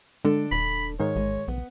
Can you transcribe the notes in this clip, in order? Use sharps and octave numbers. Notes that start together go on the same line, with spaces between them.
D3 G#3 D4 A4
D#1 B5
G#2 D#3 C#5
A1 G#3
B1 B3